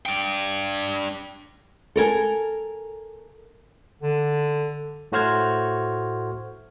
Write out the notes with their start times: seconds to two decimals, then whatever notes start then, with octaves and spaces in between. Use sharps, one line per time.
0.06 D4 G5
1.96 A4 A#4 G#5
4.02 D3
5.12 A2 A3 F#4 C5 F6 G#6